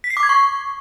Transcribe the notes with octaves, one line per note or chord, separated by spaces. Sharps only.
B6
C7
D6
G#6
C#6